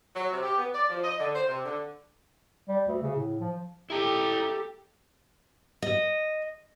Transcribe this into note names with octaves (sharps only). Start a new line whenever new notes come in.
F#3
C3
G4
B3
D5
F3
D#5
D3
C5
C3
D3
G3
D2
C#3
A2
F3
E4 G4 A4 A#5
D#5